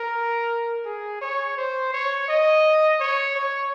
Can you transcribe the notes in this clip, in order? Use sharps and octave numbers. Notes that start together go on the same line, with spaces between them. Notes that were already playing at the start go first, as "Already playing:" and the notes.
Already playing: A#4
G#4
C#5
C5
C#5
D#5
C#5
C#5